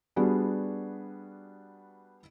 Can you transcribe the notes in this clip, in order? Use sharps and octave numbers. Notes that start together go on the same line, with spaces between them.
G3 B3 D4 F#4 G#4